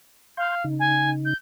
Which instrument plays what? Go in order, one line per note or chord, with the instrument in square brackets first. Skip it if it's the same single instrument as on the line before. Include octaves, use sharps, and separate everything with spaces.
[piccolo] F5 [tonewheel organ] C6 G6
[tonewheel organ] C#3 D#4
[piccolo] G#5
G6